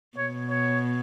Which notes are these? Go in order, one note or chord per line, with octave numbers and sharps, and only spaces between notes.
B2 C#5
C#5